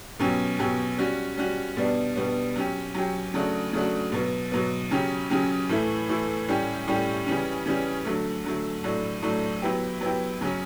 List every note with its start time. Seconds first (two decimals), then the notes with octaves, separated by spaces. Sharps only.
0.19 B2 F#3 C#4 G4
0.59 B2 F#3 C#4 G4
0.98 G3 C#4 F#4
1.37 G3 C#4 F#4
1.77 B2 G3 B3 D4
2.16 B2 G3 B3 D4
2.56 F#3 C#4 G4
2.95 F#3 C#4 G4
3.34 C#3 F#3 A3 D4 F#4
3.73 C#3 F#3 A3 D4 F#4
4.12 B2 F#3 B3
4.52 B2 F#3 B3
4.91 C#3 F#3 C#4 G4
5.30 C#3 F#3 C#4 G4
5.69 A2 E3 A3 E4
6.09 A2 E3 A3 E4
6.48 A2 G3 C#4 G4
6.87 A2 G3 C#4 G4
7.26 C#3 E3 G3 C#4
7.66 C#3 E3 G3 C#4
8.05 D3 F#3 A3
8.44 D3 F#3 A3
8.84 A2 F#3 A3 D4
9.22 A2 F#3 A3 D4
9.62 F#3 B3 E4 G4
10.01 F#3 B3 E4 G4
10.41 C#3 F#3 C#4